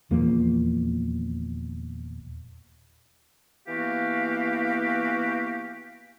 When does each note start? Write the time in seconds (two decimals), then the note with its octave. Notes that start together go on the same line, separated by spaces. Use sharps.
0.11 D#1 E2 F3 A#3
3.68 E3 A#3 B3 F#4 G4 F5